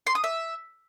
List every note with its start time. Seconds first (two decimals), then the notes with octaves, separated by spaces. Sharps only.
0.07 C6
0.15 D#6
0.24 E5